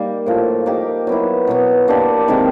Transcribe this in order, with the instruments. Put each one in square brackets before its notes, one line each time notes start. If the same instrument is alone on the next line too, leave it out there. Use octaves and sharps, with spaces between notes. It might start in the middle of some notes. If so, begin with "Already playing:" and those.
Already playing: [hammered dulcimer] G3 A#3 D#4
A2 F3 A#3
A#3 D#4 G4
F#3 B3 E4
B2 F#3 B3
A#3 D4 G4
C3 D#3 G#3